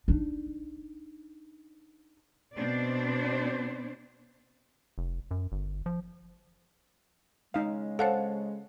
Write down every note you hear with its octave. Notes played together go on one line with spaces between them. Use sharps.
D4 D#4
B2 C4 D4 C5 D5
F1
F#2
G1
F3
C#3 G#3 D#4 F5
A4 C5 C#5 F5 F#5 A5